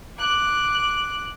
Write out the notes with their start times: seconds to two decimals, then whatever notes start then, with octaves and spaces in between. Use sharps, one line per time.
0.18 D6 F#6